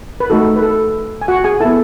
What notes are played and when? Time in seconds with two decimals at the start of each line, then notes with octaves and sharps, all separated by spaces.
0.20 B4
0.30 A3 D#4 F#4 A4
0.56 B4
0.62 A4
1.22 G#5
1.28 F#4 F#5
1.44 G#4 G#5
1.60 B3 E4 A4 A5